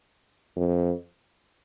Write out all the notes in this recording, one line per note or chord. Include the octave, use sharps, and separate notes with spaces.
F2